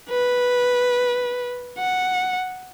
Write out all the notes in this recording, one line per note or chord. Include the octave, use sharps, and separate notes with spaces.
B4
F#5